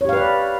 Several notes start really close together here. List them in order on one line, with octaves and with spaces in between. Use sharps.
C#5 G4 F5 B4 D5